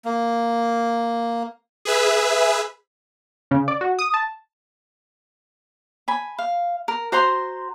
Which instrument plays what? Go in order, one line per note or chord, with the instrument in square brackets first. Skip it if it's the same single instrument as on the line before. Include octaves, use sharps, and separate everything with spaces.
[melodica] A#3
[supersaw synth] G#4 B4 E5
[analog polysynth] C#3
D5
F#4
D#6
A5
[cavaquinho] G#5 B5
F5
A#4
F#4 C5 A#5 C6